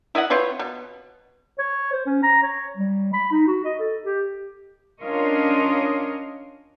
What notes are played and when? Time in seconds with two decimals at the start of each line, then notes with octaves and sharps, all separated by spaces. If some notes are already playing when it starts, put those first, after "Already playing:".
0.15 E4 D#5 E5 F#5
0.30 C4 F4 B4 C#5
0.59 B2
1.59 C#5
1.93 C5
2.06 C#4
2.23 A#5
2.43 C#5
2.77 G3
3.14 B5
3.32 D#4
3.47 F#4
3.65 D#5
3.80 A4
4.06 G4
5.00 C#4 D4 F4 A#4 C#5 D#5